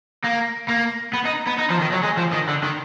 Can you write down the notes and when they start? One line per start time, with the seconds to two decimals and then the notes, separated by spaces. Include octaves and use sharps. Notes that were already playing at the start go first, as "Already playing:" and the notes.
0.24 A#3
0.68 A#3
1.13 B3
1.25 D#4
1.47 B3
1.59 D#4
1.70 F3
1.81 D#3
1.92 F#3
2.03 G#3
2.18 F3
2.33 D#3
2.49 D3
2.63 D#3